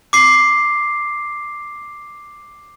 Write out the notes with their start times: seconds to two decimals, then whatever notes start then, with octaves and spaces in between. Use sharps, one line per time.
0.13 D6 C7